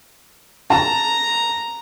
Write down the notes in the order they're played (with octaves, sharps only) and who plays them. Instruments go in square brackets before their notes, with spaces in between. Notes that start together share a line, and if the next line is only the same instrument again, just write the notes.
[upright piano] A5 [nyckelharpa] A#5